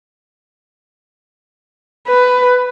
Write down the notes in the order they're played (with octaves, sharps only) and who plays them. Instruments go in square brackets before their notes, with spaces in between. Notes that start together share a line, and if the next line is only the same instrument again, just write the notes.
[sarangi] B4